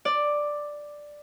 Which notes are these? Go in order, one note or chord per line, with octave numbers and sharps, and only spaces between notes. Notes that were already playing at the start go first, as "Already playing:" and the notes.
D5